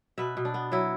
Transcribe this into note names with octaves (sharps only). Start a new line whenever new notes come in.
B2 B4 E5
B2
D4
B3
F#3 E4